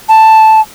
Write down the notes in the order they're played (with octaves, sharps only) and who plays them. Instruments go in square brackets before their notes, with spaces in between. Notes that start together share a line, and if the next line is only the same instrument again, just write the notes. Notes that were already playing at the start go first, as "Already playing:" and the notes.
[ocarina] A5